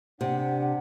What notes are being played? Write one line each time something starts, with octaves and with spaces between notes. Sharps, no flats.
C3 D4 F#5